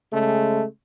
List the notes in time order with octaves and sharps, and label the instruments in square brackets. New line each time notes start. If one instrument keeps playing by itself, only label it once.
[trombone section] C#3 G#3 A3